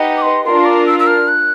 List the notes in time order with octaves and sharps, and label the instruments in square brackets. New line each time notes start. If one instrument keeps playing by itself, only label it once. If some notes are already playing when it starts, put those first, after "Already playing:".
Already playing: [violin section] D#4 G4 B4 D#5 F#5
[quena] D6
C6
[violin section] D4 F4 A#4 [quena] C6
[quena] D6
E6
E6
F6
F#6